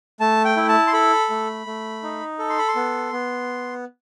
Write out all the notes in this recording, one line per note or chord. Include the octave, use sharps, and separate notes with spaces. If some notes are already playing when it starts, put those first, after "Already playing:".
A3 A5
G5
E4
A5
C6
A4 B5
A3
A3
D#4
A4
C6
B5
C6
B3
B3